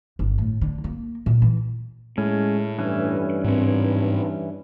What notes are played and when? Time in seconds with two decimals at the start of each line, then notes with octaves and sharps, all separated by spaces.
0.19 G1
0.38 A2
0.61 D3
0.84 A#3
1.26 A#2
1.42 E3
2.18 A2 G#3 C#4
2.79 G2 E3 C#4
3.44 G#2 C4